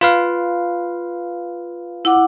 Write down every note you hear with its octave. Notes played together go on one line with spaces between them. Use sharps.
F4 B4 F5
E4 F#5 D6